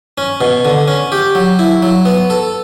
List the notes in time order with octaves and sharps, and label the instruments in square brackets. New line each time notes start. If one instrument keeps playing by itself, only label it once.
[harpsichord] C#4
B2
D3
C#4
G4
F#3
E4
F#3
B3
A4